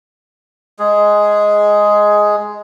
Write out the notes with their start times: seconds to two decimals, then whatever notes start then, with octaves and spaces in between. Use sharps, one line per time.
0.79 G#3 G#4